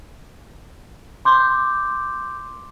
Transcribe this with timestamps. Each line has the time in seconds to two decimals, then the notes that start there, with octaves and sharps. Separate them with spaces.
1.25 C6 D6 G6